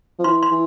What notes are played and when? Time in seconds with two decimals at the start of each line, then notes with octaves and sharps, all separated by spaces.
0.19 F3
0.24 E3 C6
0.43 C6
0.51 E3